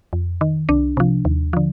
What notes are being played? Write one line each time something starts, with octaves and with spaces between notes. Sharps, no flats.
F2
D#3
C2 D4
C3 F3
D#2
D3 F3